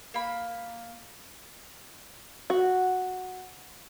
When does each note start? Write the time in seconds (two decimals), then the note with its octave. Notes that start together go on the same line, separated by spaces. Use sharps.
0.14 A#3 B5
2.50 F#4